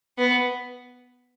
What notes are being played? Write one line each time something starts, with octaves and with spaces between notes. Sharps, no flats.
B3